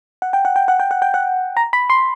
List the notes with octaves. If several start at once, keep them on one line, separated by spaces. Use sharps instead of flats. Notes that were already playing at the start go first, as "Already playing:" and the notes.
F#5
G5
F#5
G5
F#5
G5
F#5
G5
F#5
A#5
B5
C6